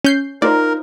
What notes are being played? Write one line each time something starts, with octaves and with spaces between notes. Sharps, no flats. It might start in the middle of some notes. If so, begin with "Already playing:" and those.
C#4 G6 C7
D#4 F4 A#4 C5 D5